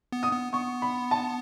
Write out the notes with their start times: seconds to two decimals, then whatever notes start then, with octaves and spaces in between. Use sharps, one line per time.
0.12 B3
0.23 D#6
0.32 B3
0.53 B3 C#6
0.82 B5
1.11 A5